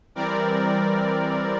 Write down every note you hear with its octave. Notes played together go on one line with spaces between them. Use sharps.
E3 G3 C4 A#4 D5